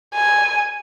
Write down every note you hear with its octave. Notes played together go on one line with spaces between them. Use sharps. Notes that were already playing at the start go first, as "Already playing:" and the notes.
G#5